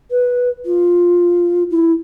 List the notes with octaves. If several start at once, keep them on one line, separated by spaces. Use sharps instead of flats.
B4
F4
E4